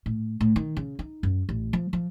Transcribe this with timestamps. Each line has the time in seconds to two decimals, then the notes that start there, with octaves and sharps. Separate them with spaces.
0.06 A2
0.40 A2
0.56 D#3
0.77 C#3
0.99 D#4
1.23 F#2
1.49 A1
1.73 F3
1.93 F3